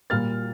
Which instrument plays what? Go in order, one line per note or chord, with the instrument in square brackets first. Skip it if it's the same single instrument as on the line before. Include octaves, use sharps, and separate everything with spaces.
[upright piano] A#2 G3 A#3 F6 A6